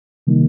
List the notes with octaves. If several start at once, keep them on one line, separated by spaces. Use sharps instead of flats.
C3 D#3 G3 A#3 D#4